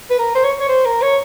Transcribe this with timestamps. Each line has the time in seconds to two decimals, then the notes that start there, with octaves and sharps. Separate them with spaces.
0.10 B4
0.19 A#4
0.35 C5
0.44 C#5
0.60 C#5
0.68 C5
0.86 A#4
1.02 C#5